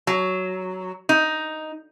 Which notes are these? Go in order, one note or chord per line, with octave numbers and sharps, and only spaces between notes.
F#3
D#4